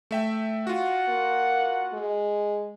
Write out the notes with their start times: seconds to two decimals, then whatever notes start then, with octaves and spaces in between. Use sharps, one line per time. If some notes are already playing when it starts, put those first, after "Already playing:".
0.11 A3 E5 G5
0.67 F4 F#4 F#5
1.08 A#3
1.93 G#3